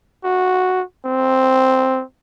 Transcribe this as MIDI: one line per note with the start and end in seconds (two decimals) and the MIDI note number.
0.24 0.83 66
1.05 2.03 60